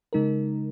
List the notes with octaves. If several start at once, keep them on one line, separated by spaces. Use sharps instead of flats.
C#3 G#3 D#4 A#4